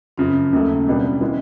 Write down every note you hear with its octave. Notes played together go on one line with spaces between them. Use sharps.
F#2 C#3 F3 C#4
D#2 C#3 F#3 A3
C2 B2 G3 B3 D4
E3 G#3 B3